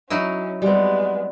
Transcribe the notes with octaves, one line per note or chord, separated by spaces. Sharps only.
F#3 C#4 D#4 E4
G3 G#3 B3 C4